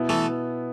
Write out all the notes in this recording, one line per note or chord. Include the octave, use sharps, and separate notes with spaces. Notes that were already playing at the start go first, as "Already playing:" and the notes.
Already playing: B2 B3 E4
E3 A3